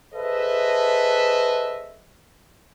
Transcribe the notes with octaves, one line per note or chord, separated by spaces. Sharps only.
G#4 A4 B4 C5 D#5 E5